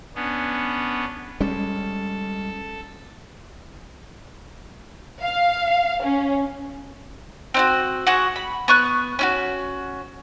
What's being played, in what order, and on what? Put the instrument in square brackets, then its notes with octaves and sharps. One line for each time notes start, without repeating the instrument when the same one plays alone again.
[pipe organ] B3 C#4 D4
[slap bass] G3 G#3 C#4 [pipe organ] A4
[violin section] F5
C#4
[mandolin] C4 D#4 F#4
F#4 G#4 F#5
B5
B3 C#6 F#6
C#4 E4 F#4